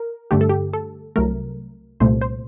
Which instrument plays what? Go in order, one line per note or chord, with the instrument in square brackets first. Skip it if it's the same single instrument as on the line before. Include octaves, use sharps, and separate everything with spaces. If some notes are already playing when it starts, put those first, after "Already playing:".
Already playing: [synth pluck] A#4
G2 D3 A3 G4
A4
G4
A4
C2 C3 F#3 A3 A#4
C2 A#2 A3 C5
C5